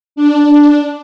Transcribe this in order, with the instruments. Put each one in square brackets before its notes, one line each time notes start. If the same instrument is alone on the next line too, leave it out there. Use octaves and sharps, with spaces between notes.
[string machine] D4